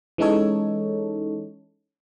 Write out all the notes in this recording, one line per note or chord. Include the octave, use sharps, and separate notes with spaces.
E3 G#3 C#4 D#4 A4 C#5